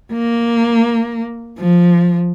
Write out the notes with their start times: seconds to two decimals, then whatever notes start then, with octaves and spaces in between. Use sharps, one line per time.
0.13 A#3
1.59 F3